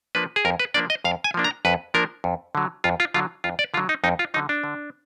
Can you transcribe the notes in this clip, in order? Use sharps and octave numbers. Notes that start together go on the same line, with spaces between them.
F3 A#3 D4 B4
G#4
F2 A#4
B4
F3 A#3 D4 D5
D#5
F2 F5
G#5
F3 A#3 D4
A#5
F2 B4
F3 A#3 D4 A#4
F2
D3 F#3
F2 F4
F4
D3 F#3 F4
F2 F4
D5
D3 F#3 F4
D#4
F2 D#4
F4
D3 F#3 D#4
D4
D3